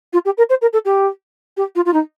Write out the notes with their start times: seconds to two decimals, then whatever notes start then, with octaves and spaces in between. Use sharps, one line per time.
0.13 F4
0.25 G4
0.37 A#4
0.50 C5
0.62 A#4
0.73 A4
0.85 G4
1.57 G4
1.75 F4
1.85 F4
1.93 D#4